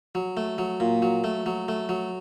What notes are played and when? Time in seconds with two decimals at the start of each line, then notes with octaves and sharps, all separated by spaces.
0.15 F#3
0.37 A3
0.58 F#3
0.80 A#2
1.02 F#3
1.24 A3
1.46 F#3
1.68 A3
1.89 F#3